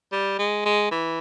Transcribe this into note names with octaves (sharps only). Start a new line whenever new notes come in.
G3
G#3
G#3
E3